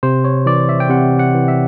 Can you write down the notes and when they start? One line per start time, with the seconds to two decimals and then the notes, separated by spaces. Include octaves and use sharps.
0.03 C3 C5
0.25 C#5
0.46 E3 D5
0.69 E5
0.80 G5
0.90 C3 F#5
1.19 F#5
1.34 E3
1.48 E5